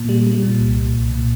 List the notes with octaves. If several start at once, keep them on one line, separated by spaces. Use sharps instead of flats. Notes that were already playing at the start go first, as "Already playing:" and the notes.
Already playing: A#2
G3
G3
A#2
C2
A#2
C2
A#2